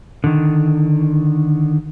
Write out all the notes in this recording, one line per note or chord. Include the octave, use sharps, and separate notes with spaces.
D3 D#3